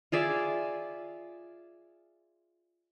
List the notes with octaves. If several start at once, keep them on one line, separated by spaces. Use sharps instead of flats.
F4 G#4 D5 E5